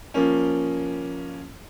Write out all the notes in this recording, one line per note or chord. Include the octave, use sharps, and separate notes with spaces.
F3 A#3 C#4